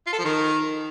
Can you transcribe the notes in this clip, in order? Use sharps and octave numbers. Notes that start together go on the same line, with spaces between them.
F4
A4
F3
D#3